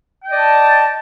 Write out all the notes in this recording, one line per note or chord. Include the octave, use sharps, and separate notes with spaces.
D5 D#5 G5 A5